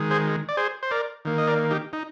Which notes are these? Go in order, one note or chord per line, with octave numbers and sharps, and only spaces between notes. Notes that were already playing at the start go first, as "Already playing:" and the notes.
Already playing: D#3 G#3
G#4 C5
D5
G#4 C5
C5
A#4 D5
D#3 A#3
D#5
A#4 D5
D#4 G4
D#4